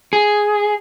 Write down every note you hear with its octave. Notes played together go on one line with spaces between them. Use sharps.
G#4